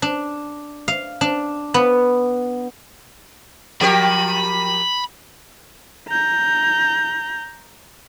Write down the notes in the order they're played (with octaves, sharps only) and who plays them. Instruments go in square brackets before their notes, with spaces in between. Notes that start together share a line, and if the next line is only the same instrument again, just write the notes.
[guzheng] D4
F5
D4
B3
[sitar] F3 G4 A#4 [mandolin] G5 [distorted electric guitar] B5
[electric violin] A#5 G6